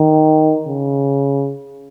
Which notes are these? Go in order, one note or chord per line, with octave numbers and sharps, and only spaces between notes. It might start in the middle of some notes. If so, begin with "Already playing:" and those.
Already playing: D#3
C#3